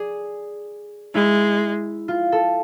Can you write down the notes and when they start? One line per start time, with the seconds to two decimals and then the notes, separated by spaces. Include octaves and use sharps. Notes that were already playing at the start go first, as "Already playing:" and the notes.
Already playing: G#4 D5
1.14 G#3 E4
2.08 F4
2.32 A4